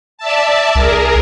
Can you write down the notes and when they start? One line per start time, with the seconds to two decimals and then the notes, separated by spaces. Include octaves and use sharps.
0.18 D5 E5 A5
0.75 C2 G#4 A#4